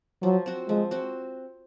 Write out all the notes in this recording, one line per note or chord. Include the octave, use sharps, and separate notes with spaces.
F3 F#3
C4 F#4
F3 G#3
C4 F#4